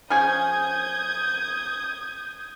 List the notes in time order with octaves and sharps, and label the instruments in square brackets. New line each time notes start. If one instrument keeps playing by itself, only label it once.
[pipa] F3 C#4 G#4 [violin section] D#6 G6 G#6